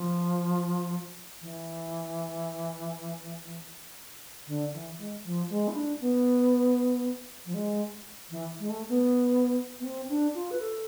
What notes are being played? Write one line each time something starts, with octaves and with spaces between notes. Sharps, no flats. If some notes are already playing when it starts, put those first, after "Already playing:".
Already playing: F3
E3
D3
E3
G#3
F3
G#3
E4
D4
B3
F3
G#3
E3
G#3
A3
B3
B3
C4
D4
F4
B4
A4